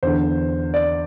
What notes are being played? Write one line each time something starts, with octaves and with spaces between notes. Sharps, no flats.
E2 D3 C5
D5